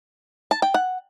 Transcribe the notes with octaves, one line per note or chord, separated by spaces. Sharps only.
A5
G5
F#5